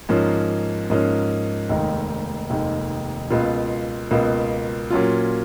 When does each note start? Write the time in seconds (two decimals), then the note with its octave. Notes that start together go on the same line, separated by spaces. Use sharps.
0.09 G#2 F3 A#3 C#4
0.90 G#2 F3 A#3 C#4
1.69 F1 D#2 D#3 G#3 D#4
2.50 F1 D#2 D#3 G#3 D#4
3.30 C#2 B2 A#3 F4
4.11 C#2 B2 A#3 F4
4.90 A#2 F#3 C#4 F4